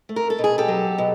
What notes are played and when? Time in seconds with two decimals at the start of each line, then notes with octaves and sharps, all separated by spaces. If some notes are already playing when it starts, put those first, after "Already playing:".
0.09 A3
0.16 A#4
0.30 A4
0.38 B2
0.44 G#4
0.58 G4 A4
0.68 F#3
0.98 B2